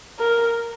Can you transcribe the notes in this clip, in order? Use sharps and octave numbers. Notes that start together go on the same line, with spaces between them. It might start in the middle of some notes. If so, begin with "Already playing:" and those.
A#4